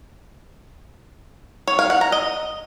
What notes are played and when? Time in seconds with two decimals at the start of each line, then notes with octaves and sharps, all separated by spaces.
1.67 C#5
1.79 F5
1.90 F#5
2.01 A#5
2.12 D#5